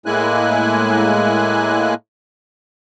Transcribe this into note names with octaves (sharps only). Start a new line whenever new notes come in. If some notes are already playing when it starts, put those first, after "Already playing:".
A2 G#3 A#3 E4 G#5 F#6